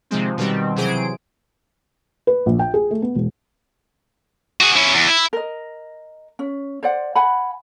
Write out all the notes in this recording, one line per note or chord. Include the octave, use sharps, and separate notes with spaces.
C3 D#3 F3 G#3 C4
B2 D#3 G3 C4
C3 E3 F#3 G#4 C5 D7
B4
A#1
G5
G#4
A3
B3
E1
F#4 G#4
C#4 E4
E2
E4
A#4 D#5
C#4
C5 D5 F#5
F#5 G#5 B5